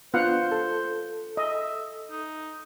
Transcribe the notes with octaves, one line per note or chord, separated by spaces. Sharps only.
B3 D4 F4 C5 F5 F#5
A4
D#5 E5
D#4